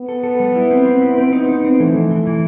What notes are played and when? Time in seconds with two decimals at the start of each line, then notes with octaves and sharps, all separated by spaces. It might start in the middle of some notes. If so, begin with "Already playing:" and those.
Already playing: B3
0.09 A4
0.23 A4
0.40 G3
0.56 E4
0.71 C4
0.86 C4
1.02 E4
1.18 B3 C4
1.32 D#4
1.49 D#4
1.64 C4
1.79 E3 A3
1.95 E3
2.11 E3
2.27 E3